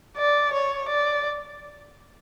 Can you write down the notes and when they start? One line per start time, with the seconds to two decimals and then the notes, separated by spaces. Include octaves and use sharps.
0.18 D5
0.53 C#5
0.89 D5